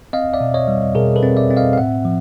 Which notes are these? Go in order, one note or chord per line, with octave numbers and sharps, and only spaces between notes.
C4 D#5 F5
D5 E5
B2
C#5 D#5
G3
B2 G#4 A#4
A4 B4
C4
D5 E5
C4
D#5 F5
F5
A2 E5 F#5
F3